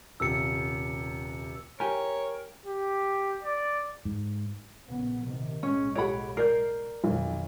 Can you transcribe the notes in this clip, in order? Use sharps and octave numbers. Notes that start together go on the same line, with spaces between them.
D#1 C3 E6 C#7
G4 A#4 C#5 G#5
G4
D5
G#2
A#1 C#3 B3
C3 D#3
B1 A2 G#3 C#4
G4 A4 C#5 F#5 B5 D7
A#4 D5 G6 C7
B1 F2 D#3